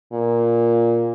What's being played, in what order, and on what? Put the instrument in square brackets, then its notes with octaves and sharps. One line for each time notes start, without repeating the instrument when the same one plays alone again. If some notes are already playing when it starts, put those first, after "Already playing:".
[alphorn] A#2